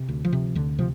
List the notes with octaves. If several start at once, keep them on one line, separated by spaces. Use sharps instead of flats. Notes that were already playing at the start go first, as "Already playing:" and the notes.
Already playing: C3
D2
F3
C3
D2 D3
C3 F3